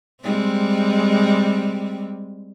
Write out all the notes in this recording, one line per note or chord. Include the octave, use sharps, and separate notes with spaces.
G3 G#3 C4